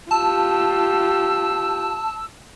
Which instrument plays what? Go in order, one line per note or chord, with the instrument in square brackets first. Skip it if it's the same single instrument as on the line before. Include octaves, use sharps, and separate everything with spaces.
[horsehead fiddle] F4 G4 [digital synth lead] A5 [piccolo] E6